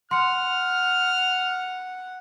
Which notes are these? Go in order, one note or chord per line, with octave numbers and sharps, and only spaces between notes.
F#5 C6 F6 C#7